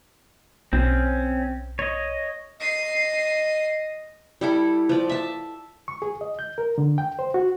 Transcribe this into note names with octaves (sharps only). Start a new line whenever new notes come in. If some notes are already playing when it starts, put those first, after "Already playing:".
B1 C4 C#4
C#5 D#5
D#5 C7 D#7
G3 E4 A4
F3 D5
E5 A5
C#6
G#4
D#5
G6
A#4
D3
G5
C5
F#4